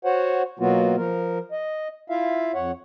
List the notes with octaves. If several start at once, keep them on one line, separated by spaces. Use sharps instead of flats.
F#4 C5 C#5 F#5
B2 F#3 A#3 B3 F4 F#4
F3 A#4
D#5
E4 F4 E5 F5
F2 C#5 F#5